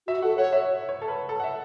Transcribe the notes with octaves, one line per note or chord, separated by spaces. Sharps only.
F#4 E5
A4 F#5
C#5 F#5
E5
C#5
A4
B4
A4
F#5
E5